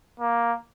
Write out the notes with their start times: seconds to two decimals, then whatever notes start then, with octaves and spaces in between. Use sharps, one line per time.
0.20 A#3